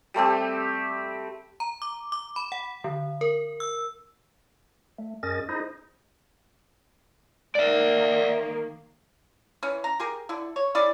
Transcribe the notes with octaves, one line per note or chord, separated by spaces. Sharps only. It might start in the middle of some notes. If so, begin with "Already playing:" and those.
G3 A3 C4 G4
A#5
D6
D6
B5
F#5
D3
A#4
E6
A3
F#2 C#4 G#4 A#4 D#5 A6
D#4 E4 G#4 C5 D#5
D#3 A#3 D5 E5
E3 C#4
A#5
G4 G#4 A#4
D3 E4
C#5
C#4 E4 G#4 D5